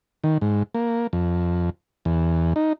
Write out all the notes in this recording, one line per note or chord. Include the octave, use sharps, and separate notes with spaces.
D#3
G#2
A#3
F2
E2
D#4